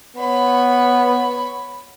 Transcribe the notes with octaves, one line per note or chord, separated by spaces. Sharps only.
B3 C#5 B5